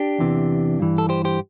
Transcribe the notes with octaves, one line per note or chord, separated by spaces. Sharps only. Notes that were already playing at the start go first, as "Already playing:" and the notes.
Already playing: D4 G4
E2 C3 E3
G2 E3
A4
G4 C5
G4 C5